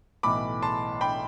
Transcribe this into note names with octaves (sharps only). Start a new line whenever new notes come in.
B1 A2 E3 A3 B5 D6
A5 C6
G5 B5